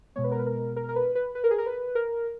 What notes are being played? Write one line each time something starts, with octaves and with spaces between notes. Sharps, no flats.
B2 G#3 B3 C#5
B4
A#4
B4
A#4
A#4
A#4
B4
B4
B4
A#4
G#4
A#4
B4
A#4